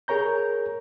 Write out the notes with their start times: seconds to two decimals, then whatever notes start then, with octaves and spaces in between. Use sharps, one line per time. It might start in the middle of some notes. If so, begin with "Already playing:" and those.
0.08 G#4 A#4 C#5 A#5 G6